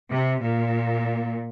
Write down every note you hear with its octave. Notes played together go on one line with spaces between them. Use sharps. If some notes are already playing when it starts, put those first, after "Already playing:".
C3
A#2